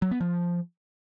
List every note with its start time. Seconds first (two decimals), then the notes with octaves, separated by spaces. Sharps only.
0.02 F#3
0.11 B3
0.21 F3